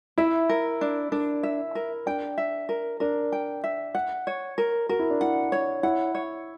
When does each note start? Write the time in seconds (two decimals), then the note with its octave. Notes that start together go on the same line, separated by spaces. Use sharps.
0.18 E4 E5
0.49 A#4
0.81 D4
1.12 D4 A#4
1.43 E5
1.75 A#4
2.06 D4 G5
2.38 E5
2.69 A#4
3.00 D4 A#4
3.32 G5
3.64 E5
3.95 F#5
4.27 C#5
4.58 A#4
4.89 F#4 A#4
4.99 E4
5.10 D4
5.21 E4 F#5
5.52 C#5
5.83 E4 F#5
6.15 C#5